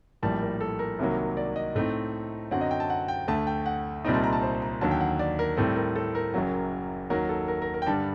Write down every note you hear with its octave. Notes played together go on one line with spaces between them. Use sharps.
A#1 A2 G3 A#3 A5
A#4
A4
A#4
C2 C3 D#3 F#3 A#3
D5
D#5
A2 A3 C4 D#4
F#2 D3 F#3 C4 F#5
D#5
G5
A5
F#5
G5
D2 D3 A3 A5
G5
F#5
C2 A#2 G3 C4 D#4 D#5
A5
A#5
A5
C5
A#5
D#2 D3 F#3 A5
G5
F#5
D5
A#4
A2 G3 C4 A4
A#4
A4
A#4
F#1 F#2 F#3
D#2 D#3 F#3 A#4
A4
A#4
A#4
A#4
G5
G2 D3 G3 A5